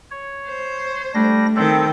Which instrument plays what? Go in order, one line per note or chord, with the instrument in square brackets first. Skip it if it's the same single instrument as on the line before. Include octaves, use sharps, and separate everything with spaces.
[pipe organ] C#5
[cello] C5
[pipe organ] G3 D4 A#6 [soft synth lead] A3
[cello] D#3 G5 [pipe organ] C4 A4